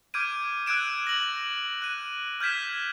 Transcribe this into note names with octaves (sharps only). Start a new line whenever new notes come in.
D6 F6 G6 G#6 D7 D#7
E6 F#6 G#6 D7 E7
A#6 F#7
F#6 D#7
F6 G6 G#6 B6 E7